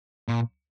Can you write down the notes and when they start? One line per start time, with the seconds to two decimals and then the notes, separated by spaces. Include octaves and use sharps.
0.28 A#2